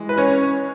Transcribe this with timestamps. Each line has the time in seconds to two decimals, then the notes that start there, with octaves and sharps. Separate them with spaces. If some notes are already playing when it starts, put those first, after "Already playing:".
Already playing: E3 G#3
0.09 B4
0.18 C#4 C#5